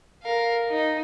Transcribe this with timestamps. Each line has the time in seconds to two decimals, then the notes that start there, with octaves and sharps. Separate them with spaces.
0.23 A#4 F5
0.70 D#4